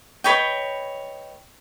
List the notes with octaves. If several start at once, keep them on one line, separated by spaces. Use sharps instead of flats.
B4 C#5 D#5 G5